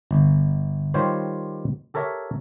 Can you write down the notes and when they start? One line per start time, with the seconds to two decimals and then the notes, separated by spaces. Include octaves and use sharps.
0.11 G1
0.94 D#3 G3 F4 G4 C5 C#5
1.94 G4 A4 A#4 C#5 E5